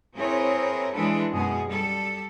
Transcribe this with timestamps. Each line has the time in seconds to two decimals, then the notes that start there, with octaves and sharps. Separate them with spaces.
0.16 C4 E4 G#4 A#4 B4 C#5
0.93 E3 G#3 D4 A4 B4
1.33 F#2 B2 G#3 G#4
1.66 G3 A4